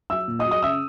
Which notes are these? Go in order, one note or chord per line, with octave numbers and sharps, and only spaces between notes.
F#3 E5 E6
A#2
D#5 D#6
F#3
D#5 D#6
C#3 E5 E6